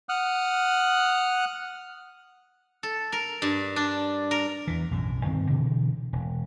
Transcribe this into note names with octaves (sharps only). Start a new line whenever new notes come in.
F#5 D#6 F6 F#6
A4
A#4
G2
D4
A#4
E2 E3
B1 F#2 A2
D2 G2 D#3 C4
B2 D3 E3
E1